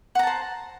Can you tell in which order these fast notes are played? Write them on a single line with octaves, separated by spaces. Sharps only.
F#5 A#5 A5 C5